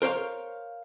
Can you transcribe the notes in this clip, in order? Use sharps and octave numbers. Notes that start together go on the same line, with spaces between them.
A#4 C5 C#5 F5